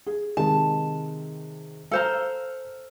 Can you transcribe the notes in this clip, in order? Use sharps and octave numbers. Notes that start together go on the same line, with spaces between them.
G#4
C3 D#3 G#3 A5
A4 C5 F5 A#5 E6 F6